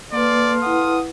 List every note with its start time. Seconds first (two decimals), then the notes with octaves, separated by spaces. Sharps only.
0.13 A#3 A4 B4 D5 F5 C6
0.63 E4 B4 F#5 D#6